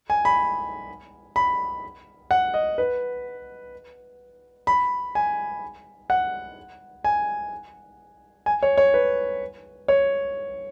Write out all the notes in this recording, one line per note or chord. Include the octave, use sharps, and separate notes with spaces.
G#5
B5
B5
F#5
D#5
B4
B5
G#5
F#5
G#5
G#5
C#5
C#5
B4
C#5